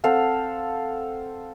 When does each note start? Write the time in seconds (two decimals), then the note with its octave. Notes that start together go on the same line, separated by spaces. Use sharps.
0.04 C4 A4 F5 F#5